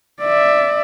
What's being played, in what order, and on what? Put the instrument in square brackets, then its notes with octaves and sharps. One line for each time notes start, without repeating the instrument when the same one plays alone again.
[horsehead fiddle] D5 E5